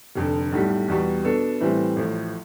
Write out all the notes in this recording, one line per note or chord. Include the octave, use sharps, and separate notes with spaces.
F1 F2 D3
B1 A2 G3
E2 B2 G3
B2 B3 D4 A4
A2 E3 G3 C4
A1 A2 F3